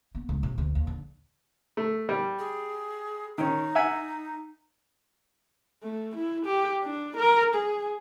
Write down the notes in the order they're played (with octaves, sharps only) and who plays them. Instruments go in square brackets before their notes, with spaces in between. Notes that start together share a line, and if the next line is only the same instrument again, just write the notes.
[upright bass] B3
C#2
C3
D2
D#2
D3
[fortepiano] A3
G3
[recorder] G#4
[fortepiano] D#3 C#4 [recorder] D#4
[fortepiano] E5 F#5 G#5
[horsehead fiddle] A3
E4
G4
D4
A#4
G#4